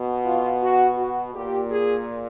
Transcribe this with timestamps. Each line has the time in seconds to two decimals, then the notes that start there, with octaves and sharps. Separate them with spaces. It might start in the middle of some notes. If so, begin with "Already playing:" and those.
Already playing: B2
0.25 F4
0.62 F#4
0.97 F#4
1.34 A#2 G4
1.70 G#4